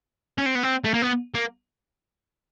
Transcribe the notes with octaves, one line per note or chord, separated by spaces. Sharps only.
C#4
C4
B3
C4
A3
A#3
B3
A#3